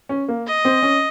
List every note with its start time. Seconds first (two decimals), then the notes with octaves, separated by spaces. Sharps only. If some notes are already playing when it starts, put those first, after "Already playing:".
0.09 C#4
0.28 A#3
0.47 D#5
0.65 C4
0.83 C#4